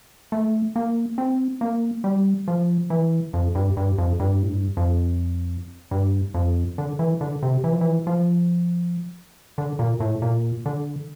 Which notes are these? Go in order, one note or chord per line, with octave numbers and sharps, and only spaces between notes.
A3
A#3
C4
A#3
G3
F3
E3
F2
G2
G2
F2
G2
A2
G2
F2
G2
F2
D3
E3
D3
C3
E3
F3
E3
F3
D3
A#2
A2
A#2
D3